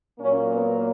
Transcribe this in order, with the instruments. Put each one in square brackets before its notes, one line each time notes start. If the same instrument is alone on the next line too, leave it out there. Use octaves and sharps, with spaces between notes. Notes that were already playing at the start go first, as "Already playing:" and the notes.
[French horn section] A#2 F#3 A#3 C#4
B3